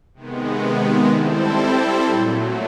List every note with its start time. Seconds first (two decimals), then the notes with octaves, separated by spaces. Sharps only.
0.14 C3 D#3 G#3 B3
1.09 G3 C4 E4 A4 C5
2.04 A#2 F#3 A3